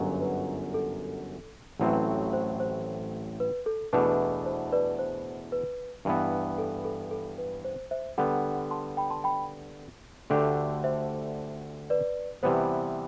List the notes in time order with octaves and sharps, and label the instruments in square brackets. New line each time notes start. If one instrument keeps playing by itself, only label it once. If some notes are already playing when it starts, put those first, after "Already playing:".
Already playing: [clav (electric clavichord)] G1 F#2 F#3
[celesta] B4
A4
[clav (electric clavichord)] A1 A2 F#3 C4 [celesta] B4
[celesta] C5
C5
B4
A4
[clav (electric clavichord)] E2 B2 A3 D4 [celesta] B4
[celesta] C5
B4 D5
C5
B4
[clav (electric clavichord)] G2 E3 B3
[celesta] A4
A4
A4
B4
C5
C5 E5
[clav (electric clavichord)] D3 G3 B3 [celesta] D5 F#5
[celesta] A5 C6
G5 B5
A5 C6
G5 B5
[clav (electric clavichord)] D2 D3 A3 D4 G4
[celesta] C5 E5
B4 D5
[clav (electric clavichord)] C3 E3 G3 B3 [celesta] C5